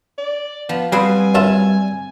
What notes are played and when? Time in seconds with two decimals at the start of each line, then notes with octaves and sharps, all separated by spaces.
0.18 D5
0.69 F3 B3
0.92 G3 C4 G#4 B4 F#5 G#5
1.35 F#2 E4 F4 A5